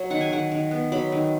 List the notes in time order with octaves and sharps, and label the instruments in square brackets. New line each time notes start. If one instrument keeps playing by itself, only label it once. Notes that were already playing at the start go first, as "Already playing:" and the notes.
Already playing: [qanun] F#3
D#3 F#5
G#5
D#3 F#5
D#3
B3
F#3 B5
D#3